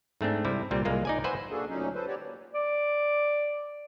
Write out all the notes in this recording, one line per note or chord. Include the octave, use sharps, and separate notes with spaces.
G#2 A3 C4 D4
C3 G3 E4
C2 A#2 G3 C4
C2 G#3 A#3 F4
D#4 D5 G#5
B4 C5 E5 F#5 G#5
A#3 D4 F#4 G#4 A4
D2 A#2 F#3 C#4 D#4
A4 B4 C5
F#4 G4 C#5 D5
A#2
D5